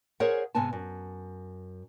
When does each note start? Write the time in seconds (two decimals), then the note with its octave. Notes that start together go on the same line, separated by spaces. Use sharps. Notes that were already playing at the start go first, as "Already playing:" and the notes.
0.20 G#4 A#4 C5 C#5 F5 F#5
0.55 G#2 C3 B3 G#5 A5
0.73 F#2